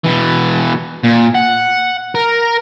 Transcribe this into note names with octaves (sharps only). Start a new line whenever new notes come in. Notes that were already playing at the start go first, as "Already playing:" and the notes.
B2 E3
A#2
F#5
A#4